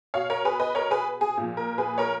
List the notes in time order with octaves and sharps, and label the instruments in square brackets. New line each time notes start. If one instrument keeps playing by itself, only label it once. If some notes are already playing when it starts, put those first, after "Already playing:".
[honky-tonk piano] B2 C#5 F5
A#4 C#5
G#4 B4
B4 D#5
A#4 C#5
G#4 B4
G#4
A#2 F3
A#4
G#4 B4
A#4 C#5